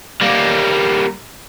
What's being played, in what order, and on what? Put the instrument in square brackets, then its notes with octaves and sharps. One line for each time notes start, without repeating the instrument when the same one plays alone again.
[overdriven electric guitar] G3 A#3